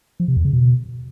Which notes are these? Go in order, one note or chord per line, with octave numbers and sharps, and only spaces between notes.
F3
C3
E2
C#3
B2